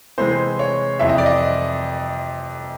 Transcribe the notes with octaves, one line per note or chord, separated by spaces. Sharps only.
C3 E3 G#3 C4 C5
C#5
F2 C3 E3 E5
D#5
D5
D#5